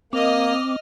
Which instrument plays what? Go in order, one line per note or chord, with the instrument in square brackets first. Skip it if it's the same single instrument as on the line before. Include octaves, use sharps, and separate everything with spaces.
[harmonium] A#3 [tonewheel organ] C4 D6 [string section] D#5 F6